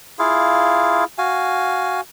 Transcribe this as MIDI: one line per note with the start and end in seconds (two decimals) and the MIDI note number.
0.19 1.04 64
0.19 1.04 65
0.19 1.04 68
0.19 1.04 77
1.18 2.01 66
1.18 2.01 77
1.18 2.01 80